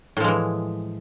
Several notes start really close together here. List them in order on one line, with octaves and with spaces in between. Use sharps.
A2 F3 G#3 E3